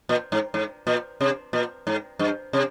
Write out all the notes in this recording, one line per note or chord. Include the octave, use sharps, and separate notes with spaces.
A#2
G#2
G#2
A#2
C3
A#2
G#2
G2
C3